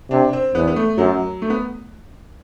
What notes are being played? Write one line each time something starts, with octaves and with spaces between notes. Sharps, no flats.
C3 D4
C4
E2 B3
B3
A3
F#2 F#3
A3
B3